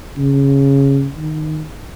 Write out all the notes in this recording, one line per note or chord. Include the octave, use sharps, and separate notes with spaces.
C#3
D#3